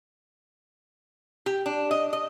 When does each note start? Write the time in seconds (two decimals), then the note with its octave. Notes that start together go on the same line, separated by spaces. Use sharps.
1.46 G4
1.66 D4
1.91 D#5
2.13 D#5